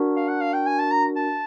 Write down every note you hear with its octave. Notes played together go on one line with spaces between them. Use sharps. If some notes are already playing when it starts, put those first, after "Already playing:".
Already playing: D4 F#4 A#4
F5
F#5
F5
G5
G#5
A5
A#5
A5